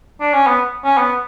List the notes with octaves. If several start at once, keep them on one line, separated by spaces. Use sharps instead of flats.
D4
C#4
B3
C#4
B3